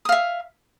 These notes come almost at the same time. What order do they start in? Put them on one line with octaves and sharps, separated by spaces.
D#6 F5 E5